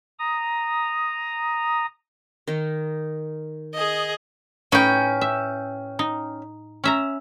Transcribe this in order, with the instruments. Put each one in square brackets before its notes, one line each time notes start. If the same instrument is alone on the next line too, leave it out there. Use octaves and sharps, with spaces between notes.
[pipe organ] A#5 D#6
[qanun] D#3 D#4
[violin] G#4 D#5
[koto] A2 D#4 B4 [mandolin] C#4 G5
[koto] E5
D#4
C#4 E5 A#5